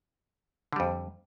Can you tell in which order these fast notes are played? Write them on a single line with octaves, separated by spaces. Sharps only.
D3 G3 F2